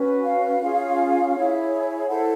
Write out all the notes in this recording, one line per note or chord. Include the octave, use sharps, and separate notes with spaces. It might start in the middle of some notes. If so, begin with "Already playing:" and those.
Already playing: C#4 F#4 B4
F5
C#4 F4 G#4
E4 G#4 C#5
E4 A4 C5 F#5